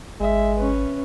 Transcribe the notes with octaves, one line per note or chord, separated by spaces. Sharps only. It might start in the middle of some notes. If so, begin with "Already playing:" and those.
G#1 G#3 E5
C#4 B4